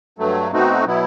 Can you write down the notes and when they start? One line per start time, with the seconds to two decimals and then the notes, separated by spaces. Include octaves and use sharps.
0.18 G2 F#3 A3
0.51 B2 A3 C4 D#4 F#4
0.84 B2 F#3 B3 E4